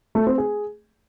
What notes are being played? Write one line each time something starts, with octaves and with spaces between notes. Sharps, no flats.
A3
C4
G#4